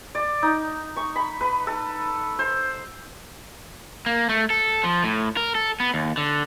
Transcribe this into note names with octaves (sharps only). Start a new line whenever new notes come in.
D5
D#4
C#6
B5
B4
A4
C5
A#3
A3
A4
F3
A2
A#4
A4
B3
D#2
D3